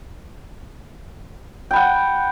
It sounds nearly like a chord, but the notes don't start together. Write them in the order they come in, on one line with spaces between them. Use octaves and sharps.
G5 B5 F#5